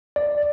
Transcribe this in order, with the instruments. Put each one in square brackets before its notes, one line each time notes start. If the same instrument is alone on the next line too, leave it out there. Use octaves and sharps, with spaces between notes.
[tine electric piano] D5